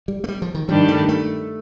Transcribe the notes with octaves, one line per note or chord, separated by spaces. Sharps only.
G3
A3
G3
F3
D#3
G2 D#3 F3 G3 D4 G4
A3
A3